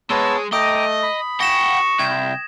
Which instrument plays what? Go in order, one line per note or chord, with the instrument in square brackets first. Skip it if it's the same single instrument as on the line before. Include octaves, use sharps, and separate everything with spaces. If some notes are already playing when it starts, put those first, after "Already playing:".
[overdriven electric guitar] G#3 [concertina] B3 A5 E6 [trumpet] C#5
[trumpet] A3 [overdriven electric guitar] D#5 [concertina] G5 A#5 D6 [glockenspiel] D#6
[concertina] B5
[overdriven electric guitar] F#5 G5 [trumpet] C#6 [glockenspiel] A#6 E7
[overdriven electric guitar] C2 [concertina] G5 [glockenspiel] G#6